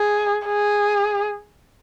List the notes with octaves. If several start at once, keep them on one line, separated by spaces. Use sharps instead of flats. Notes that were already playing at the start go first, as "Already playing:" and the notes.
Already playing: G#4
G#4